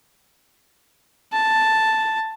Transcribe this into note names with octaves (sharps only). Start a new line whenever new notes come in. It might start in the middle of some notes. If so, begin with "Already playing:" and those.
A5